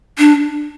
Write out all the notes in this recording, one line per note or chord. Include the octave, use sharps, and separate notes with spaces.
D4